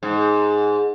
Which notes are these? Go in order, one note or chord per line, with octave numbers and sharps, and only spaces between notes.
G#2